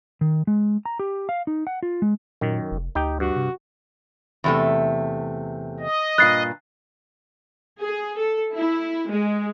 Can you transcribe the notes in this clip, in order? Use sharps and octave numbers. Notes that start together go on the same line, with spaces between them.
D#3
G#3
A#5
G4
F5
D#4
F#5
F4
G#3
F#2 A#2 D#3
F1
D2 D#4 G4 G5
G2 F#4
C3
E2 C3 A3
D#5
G2 A#2 F#6 A6 C7
G#4
A4
E4
G#3